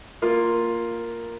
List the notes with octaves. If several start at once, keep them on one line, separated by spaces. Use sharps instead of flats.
A#3 F4